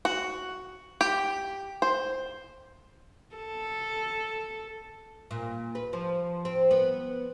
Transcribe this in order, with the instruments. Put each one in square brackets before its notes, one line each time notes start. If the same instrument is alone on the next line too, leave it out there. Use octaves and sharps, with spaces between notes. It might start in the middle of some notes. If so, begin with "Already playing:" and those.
[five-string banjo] F#4
G4
C5
[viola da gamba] A4
[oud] A#2
B4
F3
C4
B3